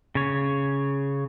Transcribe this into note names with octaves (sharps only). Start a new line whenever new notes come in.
C#3 C#5